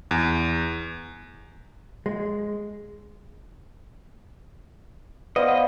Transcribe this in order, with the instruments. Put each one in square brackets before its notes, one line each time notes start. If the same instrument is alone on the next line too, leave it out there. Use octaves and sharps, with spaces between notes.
[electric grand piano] E2
[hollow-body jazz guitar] G#3
[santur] B3 C5 [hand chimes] B4 D5 F5 [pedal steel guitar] D#5